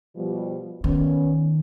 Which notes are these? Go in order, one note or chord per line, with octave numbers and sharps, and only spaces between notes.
B2 F3 G3
D#3 B3 C#4